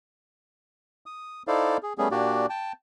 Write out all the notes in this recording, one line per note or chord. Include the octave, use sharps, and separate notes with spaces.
D#6
D#4 E4 A4 C5 D5 F5
G#4
G3 A3 B3 C#4 G#4
A#2 A#3 D4 F#4 G4 D5
G5 A5